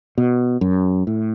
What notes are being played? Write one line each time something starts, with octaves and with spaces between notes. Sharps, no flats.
B2
F#2
A2